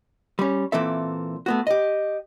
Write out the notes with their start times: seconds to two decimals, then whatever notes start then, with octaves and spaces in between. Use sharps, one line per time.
0.39 G3 C#4
0.72 A#2 E3 C4 A4 E5
1.46 A3 B3 F#4
1.67 G4 D#5